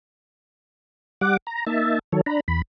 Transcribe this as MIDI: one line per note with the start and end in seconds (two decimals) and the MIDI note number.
1.21 1.37 55
1.21 1.37 78
1.21 1.37 86
1.47 1.65 82
1.67 1.99 58
1.67 1.99 63
1.67 1.99 76
1.67 1.99 81
2.12 2.21 51
2.12 2.21 54
2.12 2.21 69
2.12 2.21 73
2.26 2.40 62
2.26 2.40 82
2.26 2.40 83
2.48 2.62 40
2.48 2.62 83